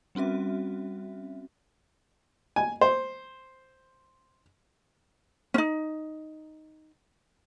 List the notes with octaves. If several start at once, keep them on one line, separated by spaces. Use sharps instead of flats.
G3 C4 C#4 F#4 E5
G#5
C5
C#4 D#4